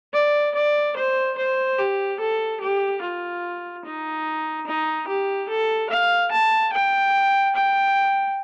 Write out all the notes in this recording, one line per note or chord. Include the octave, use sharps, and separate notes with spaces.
D5
D5
C5
C5
G4
A4
G4
F4
D#4
D#4
G4
A4
F5
A5
G5
G5